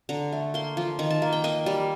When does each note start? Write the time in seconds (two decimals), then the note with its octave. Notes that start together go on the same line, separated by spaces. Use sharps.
0.09 D3 A#5
0.33 A3
0.54 A#3 C6
0.77 F3
0.99 D#3 A#5
1.10 A5
1.22 A#3
1.33 G5
1.44 A#3 D#5
1.66 G3